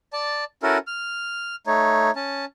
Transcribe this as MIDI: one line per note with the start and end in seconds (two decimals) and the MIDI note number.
0.13 0.44 74
0.13 0.44 81
0.63 0.78 61
0.63 0.78 64
0.63 0.78 66
0.63 0.78 69
0.63 0.78 70
0.87 1.56 89
1.67 2.11 57
1.67 2.11 63
1.67 2.11 73
2.16 2.45 61
2.16 2.45 81